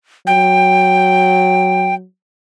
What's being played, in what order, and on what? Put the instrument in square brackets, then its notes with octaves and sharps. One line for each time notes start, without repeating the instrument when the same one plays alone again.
[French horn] F#3 [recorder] G5